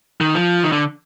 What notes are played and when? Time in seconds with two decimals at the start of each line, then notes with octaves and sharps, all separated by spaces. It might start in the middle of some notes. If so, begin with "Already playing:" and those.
0.21 D#3
0.35 F3
0.63 D#3
0.72 D3